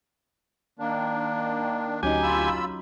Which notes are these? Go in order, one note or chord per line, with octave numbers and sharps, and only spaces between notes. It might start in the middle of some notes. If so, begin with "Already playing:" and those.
D#3 A#3 D4
D2 F#3 C#4 D#4 G4 G#5
F4 B5 E6